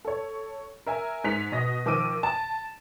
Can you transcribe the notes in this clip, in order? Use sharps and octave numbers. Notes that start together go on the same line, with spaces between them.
A4 C#5
A#4 E5 G#5
G#2 G#5 B6 C#7 F7
B2 D#5 A#6
D#3 F3 D6 E6 D7 D#7
A5